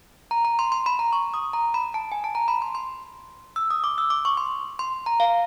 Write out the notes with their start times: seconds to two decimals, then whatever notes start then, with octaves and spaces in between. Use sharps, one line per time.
0.31 A#5
0.45 A#5
0.59 C6
0.72 C6
0.86 B5
0.99 A#5
1.13 C#6
1.34 D#6
1.53 A#5
1.74 B5
1.94 A5
2.12 G#5
2.24 A5
2.35 A#5
2.48 B5
2.62 C6
2.75 C6
3.56 E6
3.70 D#6
3.84 D6
3.98 E6
4.10 D6
4.25 C#6
4.37 C6
4.79 C6
5.06 A#5
5.20 F5